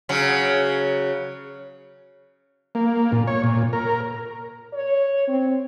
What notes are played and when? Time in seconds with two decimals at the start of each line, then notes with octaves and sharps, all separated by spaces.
0.09 C#3 F#3
2.75 A#3
3.12 A#2
3.27 C#5
3.44 A#2
3.73 A#4
4.73 C#5
5.28 C4